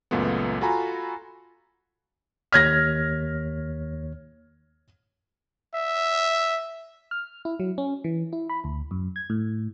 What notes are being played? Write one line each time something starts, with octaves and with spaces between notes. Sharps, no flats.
C#2 F#2 A#2 A3 B3
F4 F#4 A4 G#5 A#5 B5
D#2 C#5 F6 G#6 A#6 B6
E5
F6
E4
F#3
C#4
E3
E4
B5
D2
F#2
G#6
A2